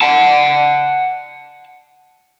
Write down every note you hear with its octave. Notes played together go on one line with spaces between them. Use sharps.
F#5 A5